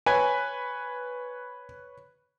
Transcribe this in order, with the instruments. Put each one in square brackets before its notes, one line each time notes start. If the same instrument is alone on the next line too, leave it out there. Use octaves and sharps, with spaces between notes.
[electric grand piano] B4 C#5 B5 [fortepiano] G#5